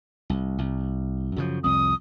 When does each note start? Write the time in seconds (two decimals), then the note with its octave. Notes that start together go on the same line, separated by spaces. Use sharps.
0.30 C2
0.58 C2
1.36 F#2 C#3 F3
1.64 C2 F2 D#6